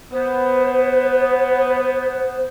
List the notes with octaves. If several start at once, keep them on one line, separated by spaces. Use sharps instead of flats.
B3 C5